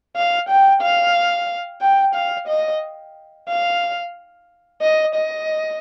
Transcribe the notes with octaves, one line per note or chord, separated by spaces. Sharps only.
F5
G5
F5
G5
F5
D#5
F5
D#5
D#5